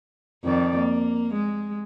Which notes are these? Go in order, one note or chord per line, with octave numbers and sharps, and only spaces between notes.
F2 D#3 D5
A#3
G#3